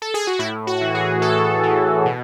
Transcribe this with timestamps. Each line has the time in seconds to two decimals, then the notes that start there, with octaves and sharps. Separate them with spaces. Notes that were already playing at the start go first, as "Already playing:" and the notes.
0.02 A4
0.14 G#4
0.27 F#4
0.39 A2 E4
0.67 F#4
0.81 E3
0.95 G#4
1.22 A2 A4
1.63 E3
2.06 B2